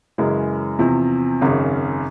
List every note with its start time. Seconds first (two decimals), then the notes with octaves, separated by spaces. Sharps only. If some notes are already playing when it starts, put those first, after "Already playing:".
0.18 F#2 C#3 E3 G#3
0.79 E2 C3 F3
1.41 G#1 F#2 C#3